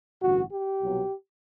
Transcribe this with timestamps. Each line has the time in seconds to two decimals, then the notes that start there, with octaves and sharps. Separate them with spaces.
0.21 A1 G2 D3 F#4
0.51 G4
0.80 C2 B2 F#3